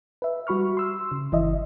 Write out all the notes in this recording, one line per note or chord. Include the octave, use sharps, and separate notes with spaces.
B4 E5
G3 F#4 B5 C#6 F6
C6 E6
C#3
G1 E3 D#5 E5